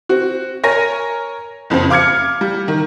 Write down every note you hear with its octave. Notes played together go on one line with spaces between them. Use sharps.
C4 F#4
A#4 C#5 G#5 A#6 D#7
F#1 F2 C#3 C4
F5 D6 F6 G#6 C#7
G3
D#3